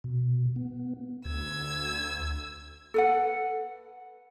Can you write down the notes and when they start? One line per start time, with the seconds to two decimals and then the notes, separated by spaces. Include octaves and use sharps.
0.04 B2
0.56 B3
1.25 D2 E6 G#6
2.94 A4 B4 F#5